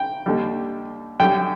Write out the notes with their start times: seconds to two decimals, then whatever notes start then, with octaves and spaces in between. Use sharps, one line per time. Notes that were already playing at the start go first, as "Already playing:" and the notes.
Already playing: G5
0.26 D#2 D3 G3
1.20 F#2 D3 G3 G5